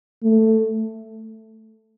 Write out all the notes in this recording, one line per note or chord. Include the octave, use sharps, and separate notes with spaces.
A3